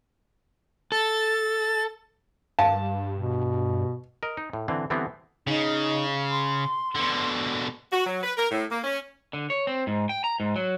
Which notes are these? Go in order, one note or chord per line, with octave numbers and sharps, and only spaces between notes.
A4 A6
G2 F5 A5
B2
A#4 D#5
D#4
A2
D3 E3 C4
D3 E3 G3 B3 C4
C#3 D#4
C6
B2 D3
F#4
F#3
B4
A#4
A2
A#3
C#4
D3
C#5
C4
G#2
G5
A#5
G#2
F#3